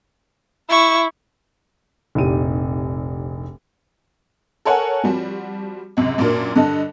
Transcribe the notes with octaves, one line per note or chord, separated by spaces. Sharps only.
E4 C#6
F1 A#1 C3 D#4 G4 D#7
A4 A#4 C#5 F#5 G#5
F3 G3 C4 F#4
C#2 F#2 C3
F#2 A#2 F#3 A#3 D4 A#4
G2 D3 A4 D#5